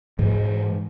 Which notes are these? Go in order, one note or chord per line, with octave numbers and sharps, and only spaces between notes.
G#2 E3 G#3